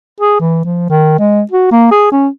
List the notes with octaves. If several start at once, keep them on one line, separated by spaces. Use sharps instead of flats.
G#4
E3
F3
D#3
G#3
F#4
A#3
G#4
C#4